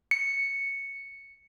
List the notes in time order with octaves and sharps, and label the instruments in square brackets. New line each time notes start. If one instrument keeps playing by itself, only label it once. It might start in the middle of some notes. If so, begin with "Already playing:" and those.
[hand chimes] C#7